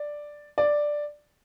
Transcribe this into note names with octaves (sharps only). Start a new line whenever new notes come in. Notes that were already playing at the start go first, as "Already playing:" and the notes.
Already playing: D5
D5